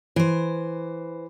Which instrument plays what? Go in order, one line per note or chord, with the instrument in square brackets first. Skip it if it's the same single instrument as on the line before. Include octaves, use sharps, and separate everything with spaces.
[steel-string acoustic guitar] E3 C5